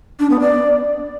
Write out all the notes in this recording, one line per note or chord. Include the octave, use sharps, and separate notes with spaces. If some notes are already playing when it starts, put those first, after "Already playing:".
D4
B3
D5